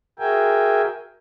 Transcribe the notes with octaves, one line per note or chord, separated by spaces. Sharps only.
F#4 G#4 A#4 E5 G5 G#5